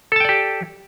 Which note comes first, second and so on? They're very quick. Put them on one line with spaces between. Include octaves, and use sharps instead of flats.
A4 A5 G5 D5 G4